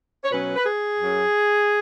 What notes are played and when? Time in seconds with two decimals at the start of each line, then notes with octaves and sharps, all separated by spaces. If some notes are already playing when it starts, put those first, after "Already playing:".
0.24 C#5
0.31 B2 F#3 C#4 B4
0.56 B4
0.64 G#4
0.99 F#2 F#3 C#4